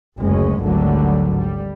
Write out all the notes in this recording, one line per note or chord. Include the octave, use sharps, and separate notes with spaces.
F#1 D2 G#3 C#4
G#1 D2 D3 F#3 G3
G3